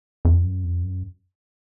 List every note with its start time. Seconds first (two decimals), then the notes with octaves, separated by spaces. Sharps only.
0.25 F2
0.45 F#2
0.64 F2
0.83 F#2